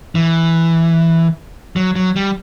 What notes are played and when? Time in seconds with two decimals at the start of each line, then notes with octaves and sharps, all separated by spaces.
0.15 E3
1.76 F#3
1.96 F#3
2.16 G3